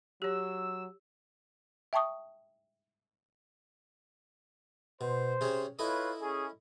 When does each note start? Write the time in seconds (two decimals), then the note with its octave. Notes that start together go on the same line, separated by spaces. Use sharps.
0.22 F#3 G4 C#5 E6
1.93 E5 G5 A5 C#6 D#6
5.01 B2 C5
5.41 C3 C#4 G#4
5.79 E4 F4 A4 B4 C#5 D#5
6.21 C#4 G#4